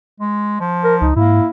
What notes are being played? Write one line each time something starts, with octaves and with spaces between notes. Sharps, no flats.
G#3
F3
A#4
C#2 D#4
G#2 A#3 E4